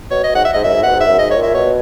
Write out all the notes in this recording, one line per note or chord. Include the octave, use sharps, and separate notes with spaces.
B2 C#5
B2 D#5
G#2 F#5
E5
G#2 D#5
F#2 E5
G#2
B2 F#5
G#2
E5
F#2
G#2 D#5
C#5
A#2
E5
B2 C#5